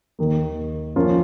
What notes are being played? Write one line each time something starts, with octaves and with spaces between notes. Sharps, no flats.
D#2 D#3 A#3
F#2 F3 A#3 C#4 F4